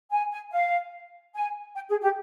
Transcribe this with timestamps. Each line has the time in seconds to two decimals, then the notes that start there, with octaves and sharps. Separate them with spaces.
0.11 G#5
0.32 G#5
0.52 F5
1.34 G#5
1.74 G5
1.89 G#4
2.02 G4